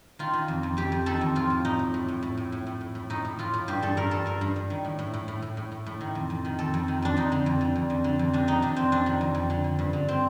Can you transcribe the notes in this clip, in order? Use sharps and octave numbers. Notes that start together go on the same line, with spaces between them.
D#3 F4
D#3
F2
F2
F2 G4
F2
D#3 A4
F2
A2 F4
A2
A2 D#4
A2
A2
A2
A2
A2
A2
A2
A2
A2
A2 D#4
A2
A2 F4
A2
G2 G4
G2 A4
G2 A#4
G2 A4
G2 A#4
G2
G2
D#3
A2
A2
A2
A2
A2
A2
A2
A2
D#3
F2
F2
D#3
F2 A4
F2
D#3
F2 D4
F2 D#4
D3
F2
D3
F2
F2
D3
F2
C3 D4
D#3 D#4
C3 D4
F2 C4
F2 D4
D#3
F2
F2
D3
D3
G2
D3
C4